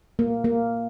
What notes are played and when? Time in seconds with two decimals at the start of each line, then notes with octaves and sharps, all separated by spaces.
0.19 A#3
0.44 A#3